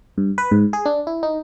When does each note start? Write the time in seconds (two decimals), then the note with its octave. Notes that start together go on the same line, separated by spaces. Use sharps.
0.18 G2
0.38 B4
0.51 G#2
0.73 G#4
0.86 D4
1.07 E4
1.23 D#4